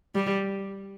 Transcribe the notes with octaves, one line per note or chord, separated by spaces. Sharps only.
G3